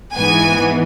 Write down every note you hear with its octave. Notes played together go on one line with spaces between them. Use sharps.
G#2 E3 B3 G#5